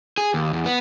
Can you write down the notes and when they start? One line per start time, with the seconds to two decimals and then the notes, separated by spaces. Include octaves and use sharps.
0.18 G#4
0.34 D#2
0.53 E2
0.66 B3